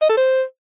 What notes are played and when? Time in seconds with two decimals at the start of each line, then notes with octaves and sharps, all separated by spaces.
0.02 D#5
0.09 A4
0.17 C5